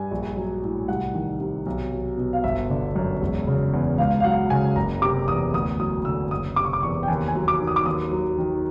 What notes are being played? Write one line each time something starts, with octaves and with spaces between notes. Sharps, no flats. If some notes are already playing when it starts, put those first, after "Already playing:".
Already playing: G2 G#5
A#1
F#3
A2
C2 F#5
D#3
C3
B1
F#3
B2
F5
G1 E5
D3
F#2
E1
C#3
E2
C#2 F5
F5
F#3 F#5
C#3 G#5
F#1 A#5
C3 D6
E2 D#6
D2 D#6
F#3 D#6
D3 E6
F#1 D#6
C3 D6
C#6
D6
E2 C#6
G5
D#2 G#5
G#5
F#3
D6
D#3
D#6
D6
D#2 D#6
F#3
D#3